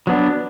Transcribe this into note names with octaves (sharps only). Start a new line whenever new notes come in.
F#3 B3 D4